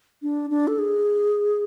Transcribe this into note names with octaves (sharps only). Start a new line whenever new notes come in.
D4
D4
A4
G#4